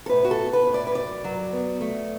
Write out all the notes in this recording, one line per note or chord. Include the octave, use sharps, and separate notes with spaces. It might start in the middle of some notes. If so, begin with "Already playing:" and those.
A4
A2 B4
F#4
A4
B3
B4
A2
D5
B4
F#2 D5
F#3
B3
A3